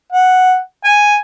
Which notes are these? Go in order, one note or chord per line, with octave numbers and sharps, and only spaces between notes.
F#5
G#5